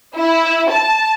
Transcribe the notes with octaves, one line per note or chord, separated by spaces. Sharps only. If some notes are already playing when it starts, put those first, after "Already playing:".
E4
A5